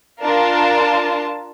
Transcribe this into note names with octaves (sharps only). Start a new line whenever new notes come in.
D4 F4 A#4 A5